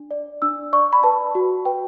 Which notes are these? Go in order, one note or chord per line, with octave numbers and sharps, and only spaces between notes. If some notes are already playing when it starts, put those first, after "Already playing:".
Already playing: D4
D5
D4 E6
D5 C#6
B5
B4 A5
F#4
B4 G5